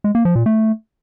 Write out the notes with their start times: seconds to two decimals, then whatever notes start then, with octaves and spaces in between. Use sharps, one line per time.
0.04 G#3
0.15 A#3
0.25 F3
0.35 A#2
0.46 A3